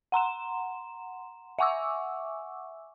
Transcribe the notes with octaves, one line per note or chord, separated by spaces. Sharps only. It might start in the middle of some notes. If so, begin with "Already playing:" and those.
F#5 A#5 C6 E7
E5 F#5 G#5 C#6 D6 E6